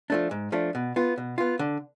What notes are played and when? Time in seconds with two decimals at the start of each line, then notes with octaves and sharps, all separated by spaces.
0.10 F3 A3 D4
0.31 G#2
0.52 F3 A3 D4
0.75 B2
0.96 B3 F4
1.18 B2
1.38 B3 F4
1.59 D3